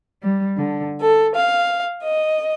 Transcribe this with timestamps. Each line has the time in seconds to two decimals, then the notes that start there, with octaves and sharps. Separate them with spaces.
0.22 G3
0.57 D3
1.01 A4
1.36 F5
2.04 D#5